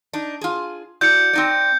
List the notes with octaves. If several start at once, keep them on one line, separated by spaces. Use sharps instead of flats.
D4 D#4
F4 G#4
E4 F#4 D5 G6 C#7
C4 D#4 D5